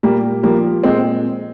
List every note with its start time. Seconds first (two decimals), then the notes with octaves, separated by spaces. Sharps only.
0.03 A#2 G3 A#3
0.43 F3 G3 A#3
0.83 A#2 G#3 C4